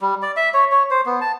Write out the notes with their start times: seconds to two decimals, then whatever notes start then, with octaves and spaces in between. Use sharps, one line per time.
0.01 G3
0.22 D5
0.36 E5
0.54 C#5
0.71 C#5
0.91 C5
1.06 B3
1.21 A5